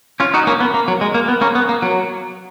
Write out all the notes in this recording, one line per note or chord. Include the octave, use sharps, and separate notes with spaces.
C#4 F4
D#4 F#4
A#3 C#4
B3
A#3
F#3
G#3
A#3
B3
A#3 C#4
B3
A#3
F#3